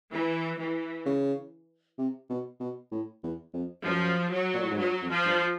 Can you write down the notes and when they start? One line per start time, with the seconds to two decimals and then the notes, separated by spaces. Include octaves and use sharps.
0.12 E3
0.58 E3
1.06 C#3
1.98 C3
2.30 B2
2.60 B2
2.92 A2
3.23 E2
3.54 F2
3.84 F#2 F3
4.32 F#3
4.54 A#2
4.63 A2
4.71 G#2
4.78 G2 F#3
5.02 F2
5.10 F3
5.25 G2